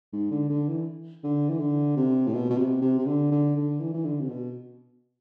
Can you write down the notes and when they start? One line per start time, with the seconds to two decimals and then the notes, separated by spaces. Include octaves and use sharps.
0.13 G#2
0.31 D3
0.50 D3
0.69 E3
1.24 D3
1.49 E3
1.60 D3
1.96 C3
2.27 A2
2.34 B2
2.50 B2
2.58 C3
2.82 C3
2.99 C3
3.06 D3
3.31 D3
3.56 D3
3.80 E3
3.94 E3
4.05 D3
4.20 C3
4.29 B2